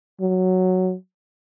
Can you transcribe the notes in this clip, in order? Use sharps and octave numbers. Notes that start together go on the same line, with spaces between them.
F#3